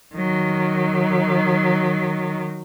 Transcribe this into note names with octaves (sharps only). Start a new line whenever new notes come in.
D#3 F#3